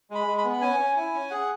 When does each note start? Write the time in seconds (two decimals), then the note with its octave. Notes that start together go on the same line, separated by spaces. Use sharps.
0.10 G#3 B5
0.27 G#3
0.38 B5
0.44 B3
0.53 B5
0.61 C#4 G#5
0.79 C#4
0.96 E4 G#5
1.14 C#4
1.30 G#4 F#5